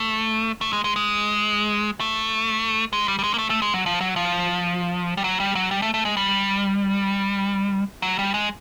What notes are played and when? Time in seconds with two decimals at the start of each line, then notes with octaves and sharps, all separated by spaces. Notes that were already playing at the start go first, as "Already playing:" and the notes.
Already playing: A3
0.61 A3
0.73 G#3
0.84 G#3
0.96 G#3
2.00 A3
2.93 G#3
3.08 G3
3.19 G3
3.24 G#3
3.34 A#3
3.38 A3
3.50 A3
3.62 G#3
3.74 F#3
3.86 F3
4.01 F#3
4.16 F3
5.17 G3
5.24 F#3
5.40 G3
5.55 F#3
5.71 G3
5.82 A3
5.94 A3
6.05 G#3
6.17 G3
8.02 F#3
8.19 G3
8.34 G#3